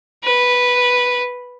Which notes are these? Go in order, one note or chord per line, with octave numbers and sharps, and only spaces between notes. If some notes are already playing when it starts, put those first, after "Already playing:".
B4